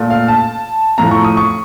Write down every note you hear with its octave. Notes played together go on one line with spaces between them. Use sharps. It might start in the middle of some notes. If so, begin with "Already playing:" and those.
Already playing: A#2 A3
F5
A5
A2 F3 A3 A#5
C#6
D#6
C#6